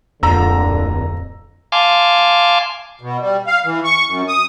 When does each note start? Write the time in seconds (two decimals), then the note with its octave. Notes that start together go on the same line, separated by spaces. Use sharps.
0.23 D1 F2 A#2 D3 A#5 E6
1.72 F5 G#5 A5 C6 D6
3.01 B2
3.20 G3
3.47 F5
3.65 E3
3.84 C#6
4.08 F#2
4.28 D#6